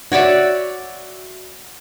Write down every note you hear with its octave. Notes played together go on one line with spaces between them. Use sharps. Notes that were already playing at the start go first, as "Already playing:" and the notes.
F#4 C#5 D5 E5